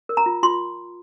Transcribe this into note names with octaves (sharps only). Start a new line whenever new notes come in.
A#4
A#5
F4
F4 C6